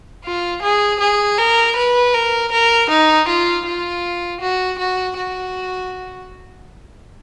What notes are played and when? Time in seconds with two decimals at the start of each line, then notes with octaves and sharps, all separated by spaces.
0.25 F4
0.62 G#4
1.00 G#4
1.38 A#4
1.76 B4
2.14 A#4
2.52 A#4
2.90 D#4
3.28 F4
3.66 F4
4.41 F#4
4.79 F#4
5.17 F#4